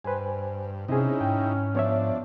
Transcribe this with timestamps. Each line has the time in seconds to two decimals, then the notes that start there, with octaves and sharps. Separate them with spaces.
0.05 G2 B4 C5 G#5
0.88 C3 C4 C#4 D#4 E4 G#4
1.21 G#2 G5
1.75 F3 B3 D4 C#5 E5